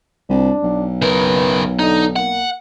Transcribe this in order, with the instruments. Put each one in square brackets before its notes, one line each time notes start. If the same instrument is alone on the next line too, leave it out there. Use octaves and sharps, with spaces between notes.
[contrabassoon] C2 [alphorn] D4
[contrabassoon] B1
[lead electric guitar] C#3 A#4 [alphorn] B4
[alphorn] D3 [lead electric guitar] D#4
[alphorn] A#3 [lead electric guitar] F#5